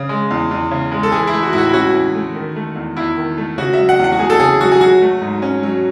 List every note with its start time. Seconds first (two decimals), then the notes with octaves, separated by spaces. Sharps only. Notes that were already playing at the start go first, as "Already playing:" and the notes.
Already playing: C#3
0.09 G#3
0.30 E2
0.51 E2
0.71 C#3
0.92 G#3
1.03 A4
1.12 E3 G#4
1.27 E4
1.33 A3
1.43 F#4
1.53 A2 E4
1.58 F#4
1.69 E4
1.73 C#4 F#4
1.94 E3
2.15 A3
2.35 D#3
2.56 A3
2.76 E2
2.97 E2 E4
3.17 D#3
3.38 A3
3.58 C#3 F#4
3.73 F#3 E5
3.89 F#5
3.99 E2
4.04 F#5
4.12 F#4
4.19 A3 G#4
4.30 A4
4.39 C#3 G#4
4.60 F#3 F#4
4.72 G#4
4.81 F#3 F#4
5.02 A3
5.22 G#2
5.42 C#4
5.63 F#3